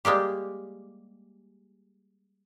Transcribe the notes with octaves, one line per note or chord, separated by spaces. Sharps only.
G3 G#3 A#3 G4